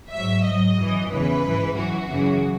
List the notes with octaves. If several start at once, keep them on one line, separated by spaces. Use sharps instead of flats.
G#2 F#3 E5
G#2 F#3 D#5
F#2 E3
E2 C#3 E3 B4
G#2 E3
F#2 E3 F#4
F#2 C#3 E3